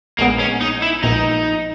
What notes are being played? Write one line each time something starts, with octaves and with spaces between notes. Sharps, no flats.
A#1 A#2 G#3 A#3 B3
C#4
D#4
E4
A#1 A#2 G#3 B3 D#4